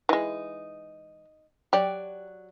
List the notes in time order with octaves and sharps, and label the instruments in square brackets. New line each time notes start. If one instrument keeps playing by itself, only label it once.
[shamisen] E3 G#3 [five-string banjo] D#4
[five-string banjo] F#3 D5 G5 [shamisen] G4